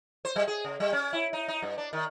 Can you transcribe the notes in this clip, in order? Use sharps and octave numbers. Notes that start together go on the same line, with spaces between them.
C5
G3
G#4
C#3
G3
C#4
E4
D#4
D#4
G2
D4
D#3